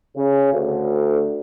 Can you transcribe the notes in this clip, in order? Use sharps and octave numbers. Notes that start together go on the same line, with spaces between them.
C#3
D2